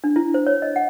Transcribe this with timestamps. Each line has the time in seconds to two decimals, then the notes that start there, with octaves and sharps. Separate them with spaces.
0.04 D4
0.16 E4
0.34 C5
0.47 C#5
0.62 D#5
0.76 F#5